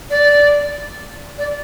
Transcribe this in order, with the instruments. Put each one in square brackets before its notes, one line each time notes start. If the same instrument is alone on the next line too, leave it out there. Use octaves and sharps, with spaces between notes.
[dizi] D5
D5